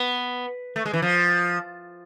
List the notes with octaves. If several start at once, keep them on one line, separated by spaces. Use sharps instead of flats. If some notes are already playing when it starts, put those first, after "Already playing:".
Already playing: B3
A3
G#3
E3
F3